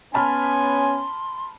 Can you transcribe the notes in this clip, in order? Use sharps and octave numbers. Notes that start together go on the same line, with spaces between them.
B3 C#4 G#5 A5 B5 C6 F6